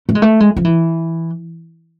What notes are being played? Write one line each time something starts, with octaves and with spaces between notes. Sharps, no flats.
A3
G#3
A3
G#3
F3
E3